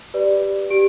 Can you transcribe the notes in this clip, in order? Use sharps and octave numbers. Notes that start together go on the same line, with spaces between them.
G4 B4 D5
G4 D7